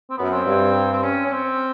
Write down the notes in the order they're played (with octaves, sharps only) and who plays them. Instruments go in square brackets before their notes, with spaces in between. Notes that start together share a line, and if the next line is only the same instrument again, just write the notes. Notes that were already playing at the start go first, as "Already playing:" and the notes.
[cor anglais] C4
[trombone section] F#2 [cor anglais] B3
[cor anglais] C4
[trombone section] G2
[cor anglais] C4
C#4
C#4
C4